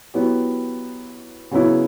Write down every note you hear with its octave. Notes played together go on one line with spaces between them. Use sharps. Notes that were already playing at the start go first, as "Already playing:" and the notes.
F#3 B3 E4 G4
C#3 F#3 B3 E4